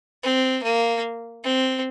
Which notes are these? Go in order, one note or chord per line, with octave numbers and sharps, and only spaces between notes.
C4
A#3
C4